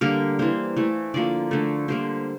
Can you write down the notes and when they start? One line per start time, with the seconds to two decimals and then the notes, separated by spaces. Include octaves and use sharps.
0.01 D3 G3 A#3 A#4
0.39 E3 A#3 C5
0.76 E3 A3
1.14 D3 F3 A#3 D5
1.51 D3 A3
1.88 D3 G3 A#3 C5